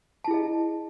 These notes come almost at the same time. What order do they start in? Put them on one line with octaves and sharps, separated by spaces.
A5 E4 G#4 D#5